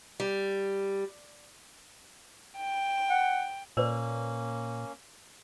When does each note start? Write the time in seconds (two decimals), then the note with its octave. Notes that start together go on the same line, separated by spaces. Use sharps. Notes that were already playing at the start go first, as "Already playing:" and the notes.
0.20 G3
2.57 G5
3.10 F#5
3.77 A#2 A#3 C#4 B4 C5 D5